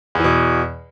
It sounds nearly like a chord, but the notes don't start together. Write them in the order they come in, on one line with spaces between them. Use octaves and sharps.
E2 E3 B2